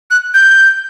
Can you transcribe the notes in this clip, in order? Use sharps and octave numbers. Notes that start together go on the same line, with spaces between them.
F#6
G6